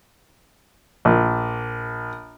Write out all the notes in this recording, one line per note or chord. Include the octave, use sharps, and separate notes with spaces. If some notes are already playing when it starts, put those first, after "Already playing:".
A#1